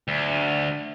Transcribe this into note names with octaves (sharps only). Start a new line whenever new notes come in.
D2